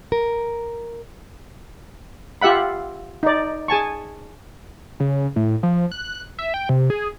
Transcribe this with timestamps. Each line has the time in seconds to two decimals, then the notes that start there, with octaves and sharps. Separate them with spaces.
0.12 A#4
2.41 F4 G4 E5 F#5 B5
3.23 D#4 D5
3.68 G#4 G#5 A5 C#6
5.00 C#3
5.36 A2
5.63 F3
5.92 F#6
6.39 E5
6.54 G5
6.69 C3
6.90 G#4